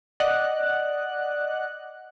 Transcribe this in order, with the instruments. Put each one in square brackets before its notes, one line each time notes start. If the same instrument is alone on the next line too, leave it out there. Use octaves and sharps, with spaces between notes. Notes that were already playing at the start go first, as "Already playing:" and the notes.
[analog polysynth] D5 D#5 F#5 F#6